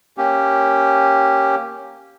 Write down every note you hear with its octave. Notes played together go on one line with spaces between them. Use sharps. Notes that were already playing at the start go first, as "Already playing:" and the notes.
A#3 C#4 G4